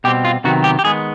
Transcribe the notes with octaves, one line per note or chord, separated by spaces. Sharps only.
B2 G3 C4 G4
F4
C3 D#3 F#3 B3 F#4
G4
G4
D#3 G#3 B3 G#4